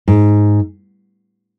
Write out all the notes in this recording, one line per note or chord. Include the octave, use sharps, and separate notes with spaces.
G#2